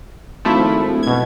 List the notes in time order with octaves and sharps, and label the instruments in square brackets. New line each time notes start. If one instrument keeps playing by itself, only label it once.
[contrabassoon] G#1 [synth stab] F3 A3 E4
[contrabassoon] D1
[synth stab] B2 G#6